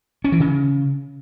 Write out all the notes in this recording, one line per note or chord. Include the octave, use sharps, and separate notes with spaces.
C#4
E3
C#3